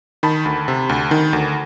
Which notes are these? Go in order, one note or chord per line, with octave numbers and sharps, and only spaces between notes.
D#3 A5 B5
D2
C3
D2
D#3
D2